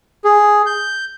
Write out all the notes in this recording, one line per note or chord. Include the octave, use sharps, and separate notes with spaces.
G#4
G6